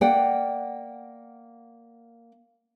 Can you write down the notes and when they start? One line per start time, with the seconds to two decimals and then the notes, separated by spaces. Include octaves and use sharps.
0.01 A#3 D5 F#5 G5